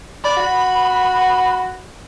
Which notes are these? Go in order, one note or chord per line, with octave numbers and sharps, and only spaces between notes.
D5 B5
F#4